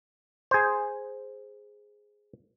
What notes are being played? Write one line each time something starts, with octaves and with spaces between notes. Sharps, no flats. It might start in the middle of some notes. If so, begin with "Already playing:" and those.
G#4 C5